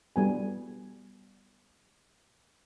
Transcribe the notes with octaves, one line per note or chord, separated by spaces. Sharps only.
G3 B3 G#5